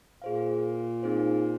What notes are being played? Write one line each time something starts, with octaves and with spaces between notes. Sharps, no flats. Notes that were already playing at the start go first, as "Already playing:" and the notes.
A#2 G#4 C5 F5
C4 D#4 G#4 C5